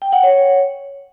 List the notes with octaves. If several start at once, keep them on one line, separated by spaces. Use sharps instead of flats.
G5
F#5
C#5